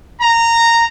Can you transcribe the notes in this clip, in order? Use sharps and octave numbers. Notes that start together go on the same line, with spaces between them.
A#5